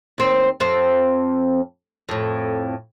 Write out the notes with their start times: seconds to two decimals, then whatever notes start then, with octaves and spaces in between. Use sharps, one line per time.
0.18 D#2 C4
0.60 F2 C4
2.09 F2 A2